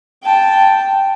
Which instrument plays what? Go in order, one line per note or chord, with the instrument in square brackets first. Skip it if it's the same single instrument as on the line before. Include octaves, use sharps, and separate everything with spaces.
[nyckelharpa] G5 A5